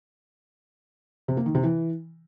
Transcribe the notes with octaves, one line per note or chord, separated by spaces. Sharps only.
C3
A#3
D#3
C3
E3